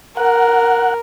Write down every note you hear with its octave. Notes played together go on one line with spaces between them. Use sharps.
A#4 F#5